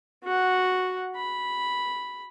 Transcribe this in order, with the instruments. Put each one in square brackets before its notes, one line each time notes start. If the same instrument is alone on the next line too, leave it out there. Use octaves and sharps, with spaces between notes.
[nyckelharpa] F#4 F#5
B5